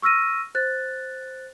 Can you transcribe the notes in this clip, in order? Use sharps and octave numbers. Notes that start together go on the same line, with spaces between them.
C#6 E6 F6 A#6 D#7
C5 F#6 A6